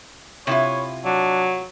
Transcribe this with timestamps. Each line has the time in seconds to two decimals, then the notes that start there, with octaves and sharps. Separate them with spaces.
0.47 C3 E4 F4 C#5
1.05 F#3 D4